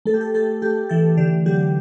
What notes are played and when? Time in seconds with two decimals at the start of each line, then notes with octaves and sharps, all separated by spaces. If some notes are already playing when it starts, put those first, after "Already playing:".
0.05 A3 A4
0.14 G4
0.21 A4
0.34 A3 A4
0.62 A3 G4
0.89 E3 A4
1.17 D3 G4
1.46 F#3 G4